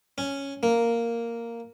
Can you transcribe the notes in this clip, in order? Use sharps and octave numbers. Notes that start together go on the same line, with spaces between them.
C#4
A#3